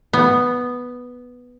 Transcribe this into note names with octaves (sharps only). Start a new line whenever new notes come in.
B3